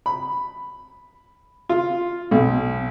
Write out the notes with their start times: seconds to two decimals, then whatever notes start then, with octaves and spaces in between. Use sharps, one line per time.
0.06 B5
1.69 F4
2.31 B1